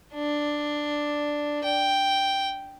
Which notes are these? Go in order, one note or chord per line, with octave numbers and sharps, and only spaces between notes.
D4
G5